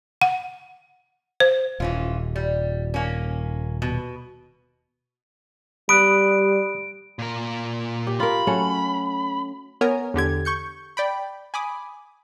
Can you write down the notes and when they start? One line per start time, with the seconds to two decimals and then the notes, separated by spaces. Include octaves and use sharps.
0.22 F#5
1.40 C5
1.80 D#1 E3 C#4 F4
2.36 G3
2.94 A#3 C#4
3.82 B2
5.89 G3 B5 D#6 F#6 D7
7.19 A#2 A#4
8.07 G4
8.20 F4 A#4 B5
8.47 F#3 A3 C#4
9.81 B3 A#4 C#5 G#5 A#5
10.14 E2 D3 G4 G#6
10.45 C#6 G6 C#7
10.97 D5 G5 B5
11.54 G#5 B5 D6 D#6